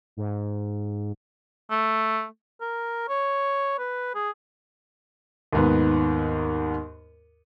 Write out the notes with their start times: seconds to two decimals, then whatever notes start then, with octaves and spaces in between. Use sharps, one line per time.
0.17 G#2
1.71 A3
2.61 A#4
3.09 C#5
3.79 B4
4.15 G#4
5.53 D#2 G#2 B3